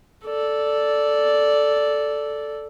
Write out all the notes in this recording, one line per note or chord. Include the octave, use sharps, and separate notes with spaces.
A4 D5